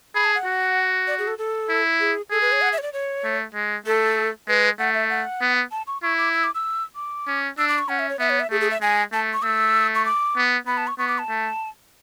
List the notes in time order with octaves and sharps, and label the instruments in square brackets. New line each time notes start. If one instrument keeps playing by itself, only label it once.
[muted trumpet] G#4 [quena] B5
[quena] A5
F#5
[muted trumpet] F#4
[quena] D5
G#4
A4
A4
[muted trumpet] E4
[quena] G#4
[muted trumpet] G#4 [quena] A4
[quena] B4
C#5
F#5
E5
C#5
D5
C#5
[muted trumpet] A3
G#3
[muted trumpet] A3 [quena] A4
[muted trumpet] G#3 [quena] B4
[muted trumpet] A3 [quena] F#5
[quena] E5
F#5
[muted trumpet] B3
[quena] A5
C#6
[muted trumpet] E4 [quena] C#6
[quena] D6
E6
D6
E6
D6
[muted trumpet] C#4
[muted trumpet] D4 [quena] E6
[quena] D6
C#6
[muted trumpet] C#4 [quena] F#5
[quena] E5
C#5
[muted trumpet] B3 [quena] E5
[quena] C#5
E5
[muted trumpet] A3 [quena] G#4
[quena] G#4
E5
[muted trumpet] G#3 [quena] G#5
[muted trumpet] A3 [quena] A5
[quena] C#6
[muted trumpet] A3 [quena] E6
[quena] C#6
D6
[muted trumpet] B3
[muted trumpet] B3 [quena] B5
[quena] A5
C#6
[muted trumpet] B3 [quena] C#6
[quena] D6
A5
[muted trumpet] A3